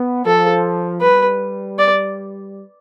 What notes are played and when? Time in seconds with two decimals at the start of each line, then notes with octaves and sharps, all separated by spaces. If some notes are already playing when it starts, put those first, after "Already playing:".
Already playing: B3
0.26 F3 A4
1.01 G3 B4
1.79 D5